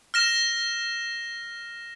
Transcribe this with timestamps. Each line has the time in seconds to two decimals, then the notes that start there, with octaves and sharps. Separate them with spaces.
0.14 F6 A#6 E7